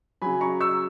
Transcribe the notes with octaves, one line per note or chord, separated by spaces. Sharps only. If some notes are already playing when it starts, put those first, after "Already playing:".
C#3 F#3 G#5 B5
A#5 C#6
C#6 E6